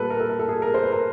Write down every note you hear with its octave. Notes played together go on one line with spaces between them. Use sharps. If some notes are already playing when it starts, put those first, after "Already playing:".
Already playing: A#2 G3 A#3 A4 B4
A#4
A4
A#4
A4
G#4
A#4
C5
B4
A#4